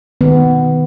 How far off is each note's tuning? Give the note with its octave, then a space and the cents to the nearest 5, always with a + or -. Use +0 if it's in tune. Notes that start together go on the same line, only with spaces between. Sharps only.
D#3 +0 B3 +15